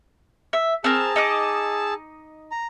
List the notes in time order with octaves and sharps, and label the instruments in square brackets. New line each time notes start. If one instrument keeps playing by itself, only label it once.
[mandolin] E5
[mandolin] C4 A#4 [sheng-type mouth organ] G#4 A5 E6
[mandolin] D#4 D#5 D6
[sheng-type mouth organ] A#5